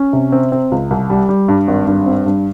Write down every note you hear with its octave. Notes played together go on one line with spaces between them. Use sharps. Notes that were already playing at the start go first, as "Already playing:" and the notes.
Already playing: C#4
C3
C4
C4
C#2
C2
G3
G3
G2
G#1
G2
C4
G2